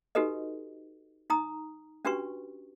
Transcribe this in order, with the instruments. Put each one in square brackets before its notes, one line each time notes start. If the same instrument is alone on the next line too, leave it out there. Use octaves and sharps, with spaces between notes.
[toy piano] D#4 F#4 G4 A4 B4 D#5
D#4 A#5 D#6
C#4 D4 F#4 G4 B4 C#6